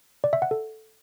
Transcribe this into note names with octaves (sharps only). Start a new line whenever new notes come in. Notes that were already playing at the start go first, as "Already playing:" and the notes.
D5
E5
F#5
A4